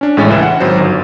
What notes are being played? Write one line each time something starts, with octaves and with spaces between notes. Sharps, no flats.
C#4 D4
A1 A2 G#3 C#4 A6
C#2 E3 E4 E7
F#5
G#1 F#3 C5
G1